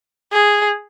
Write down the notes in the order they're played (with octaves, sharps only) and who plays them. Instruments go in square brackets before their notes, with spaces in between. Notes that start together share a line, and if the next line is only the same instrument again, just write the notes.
[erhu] G#4